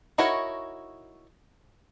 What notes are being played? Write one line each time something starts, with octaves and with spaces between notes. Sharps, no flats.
D#4 E4 F#4 A#4 C#5